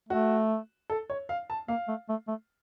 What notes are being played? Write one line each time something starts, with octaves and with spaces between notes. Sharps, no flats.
A3 F#4
A4
C#5
F5
A5
A#3 F5
A3
A3
A3